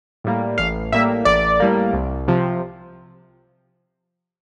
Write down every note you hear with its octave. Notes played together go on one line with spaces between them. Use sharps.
A2 G3 A#3
A1 F5
A2 G3 A#3 E5
A1 D5
A2 G3 A#3
C2
C3 F3